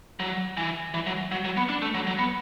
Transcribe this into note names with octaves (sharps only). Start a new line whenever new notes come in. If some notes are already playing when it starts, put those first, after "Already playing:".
F#3
E3
E3
F#3
F#3
F#3
B3
D4
A3
F#3
F#3
B3